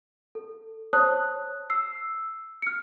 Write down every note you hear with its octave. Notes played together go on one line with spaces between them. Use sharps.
A4
C5 C#5 A5 D#6 F#6
E6 C7
F6 C#7